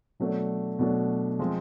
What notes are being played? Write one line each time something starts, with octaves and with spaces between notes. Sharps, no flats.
B2 F#3 A3 D4
B2 F#3 A3 D4
F3 G#3 C4